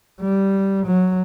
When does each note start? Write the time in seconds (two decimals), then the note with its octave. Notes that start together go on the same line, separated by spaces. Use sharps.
0.21 G3
0.86 F#3